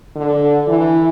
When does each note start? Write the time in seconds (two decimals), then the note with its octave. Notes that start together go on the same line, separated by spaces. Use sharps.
0.16 D3
0.67 E3